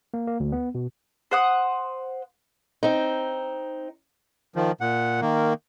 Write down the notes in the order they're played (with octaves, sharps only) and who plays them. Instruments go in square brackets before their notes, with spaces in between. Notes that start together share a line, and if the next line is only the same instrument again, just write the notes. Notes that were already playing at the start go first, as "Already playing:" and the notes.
[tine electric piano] A#3
A#3
D2
B3
B2
[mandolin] C5 F#5 D#6
[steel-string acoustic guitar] C4 D#4
[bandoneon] D#3 F3
A#2 F#5
D#3 A#3